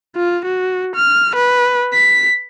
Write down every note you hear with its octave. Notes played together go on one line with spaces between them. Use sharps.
F4
F#4
F6
B4
B6